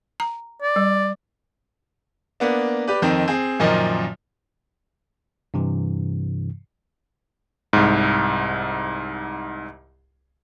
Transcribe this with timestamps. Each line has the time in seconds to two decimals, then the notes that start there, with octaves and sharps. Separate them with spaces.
0.20 A#5
0.62 D5
0.76 G3
2.40 A#3 B3 D4
2.88 G4 B4 D5
3.02 F2 D#3 C4 D#4
3.28 C4 G#4
3.60 F#2 A#2 D#3 F3 D#4
5.54 G2 C3 E3
7.73 C2 G#2